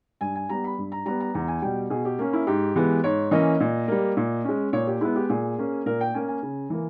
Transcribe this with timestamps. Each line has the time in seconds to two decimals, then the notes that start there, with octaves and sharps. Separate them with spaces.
0.21 G2 G#5
0.35 G#5
0.49 G3 B3 A#5
0.64 B5
0.78 G2
0.92 A#5
1.06 G3 B3 A#5
1.20 A#5
1.34 E2 A#5
1.48 G#5
1.62 B2 G3 G5
1.90 B2 G#4
2.05 G4
2.19 A#3 C#4
2.33 E4
2.47 G#2 G4
2.76 E3 G#3 B3
3.04 G#2 C#5
3.31 E3 A#3 C#4 D#5
3.60 A#2
3.88 G3 A#3
4.17 A#2
4.45 G#3 C#4
4.73 A#2 C#5
4.87 G4
5.01 G#3 B3 E4
5.16 G4
5.30 A#2 G#4
5.58 A#3 C#4
5.86 A#2 A#4
6.01 G5
6.14 A#3 C#4 G#5
6.28 G#5
6.43 C#3
6.70 E3 A#3